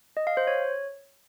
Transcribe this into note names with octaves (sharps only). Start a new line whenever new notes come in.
D#5
F5
C5
C#5